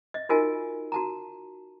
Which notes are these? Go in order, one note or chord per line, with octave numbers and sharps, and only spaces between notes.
D#5 E5
D#4 F4 F#4 A#4 D#5 G#5
F#4 A5 A#5